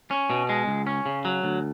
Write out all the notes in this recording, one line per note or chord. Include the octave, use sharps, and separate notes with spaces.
C#4
B2
G#3
C#2
C#4
C#3
F#3
D2